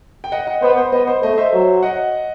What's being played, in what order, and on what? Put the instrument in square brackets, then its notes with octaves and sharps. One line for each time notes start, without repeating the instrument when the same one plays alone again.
[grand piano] G5
D#5 F#5
D#5 F#5
[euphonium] B3 [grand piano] C5
[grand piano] C5
[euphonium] B3 [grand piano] D#5
[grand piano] C5
[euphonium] A3 [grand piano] D#5
[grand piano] D#5
C5 E5
[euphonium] F#3
[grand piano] D#5 F#5